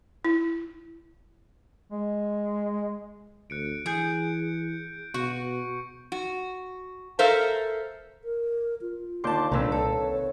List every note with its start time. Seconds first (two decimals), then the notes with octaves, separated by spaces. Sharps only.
0.25 E4
1.92 G#3
3.50 D2 F#6 C#7 D7
3.86 E3 G#4 G6 C#7 D7
5.14 B2 F#4 C#6 C#7
6.12 F#4
7.19 A4 A#4 C5 E5 F5
8.24 A#4
8.81 F4
9.24 D#2 D3 A#3 A5 C6 D6 G6
9.52 C2 A#2 D3 C4 B4 A#5 E6
9.72 A4 D5
9.94 C#5